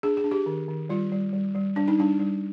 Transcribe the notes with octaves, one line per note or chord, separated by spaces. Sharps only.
D4 G#4
G#4
D4
G4
D#3
D#3
G3 F4
G3
G3
G3
G3 D4
D#4
G3 D4
G3